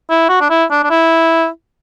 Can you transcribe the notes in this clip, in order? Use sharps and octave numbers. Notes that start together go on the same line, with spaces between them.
E4
F#4
D4
E4
D4
D4
E4